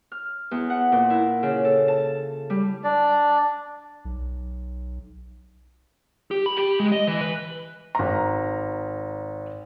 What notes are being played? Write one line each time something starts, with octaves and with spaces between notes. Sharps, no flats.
F6
E2
F#5
A#2
E4
C#3
A4
A5
G3
D4 D5
B1
G4
B5
G4
G#3
D#5
E3
B4
G#1 A#5